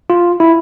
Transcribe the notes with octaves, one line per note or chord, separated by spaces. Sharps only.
F4
E4